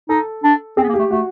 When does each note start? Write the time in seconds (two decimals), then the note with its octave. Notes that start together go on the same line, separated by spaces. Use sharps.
0.09 D#4 A4
0.44 D4
0.77 C4 G#4
0.83 B3
0.89 A#3
0.94 G4
0.99 A3
1.11 A3 F#4